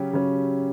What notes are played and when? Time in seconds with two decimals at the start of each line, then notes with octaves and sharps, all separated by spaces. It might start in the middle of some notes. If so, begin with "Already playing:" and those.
Already playing: C#3 F#3 C#4 G4
0.13 C#3 F#3 C#4 G4